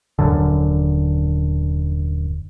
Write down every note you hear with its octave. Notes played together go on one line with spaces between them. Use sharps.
D#1 A#1 F#2 D3